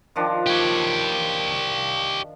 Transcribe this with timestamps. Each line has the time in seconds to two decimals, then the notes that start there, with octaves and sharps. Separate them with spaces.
0.16 D#3 F3 D4
0.47 G4 C#5